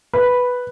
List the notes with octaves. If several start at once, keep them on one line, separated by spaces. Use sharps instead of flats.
B4